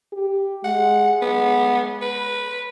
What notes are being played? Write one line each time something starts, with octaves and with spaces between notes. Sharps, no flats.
G4
G#3 F#5
B3
B4